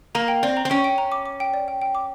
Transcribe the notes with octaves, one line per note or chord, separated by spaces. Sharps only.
A#3 A#5
G5
C4 D5
A#5
C4
C#4 G5
G5
A#5
D6
D6
G5
D5
G5
G5
D6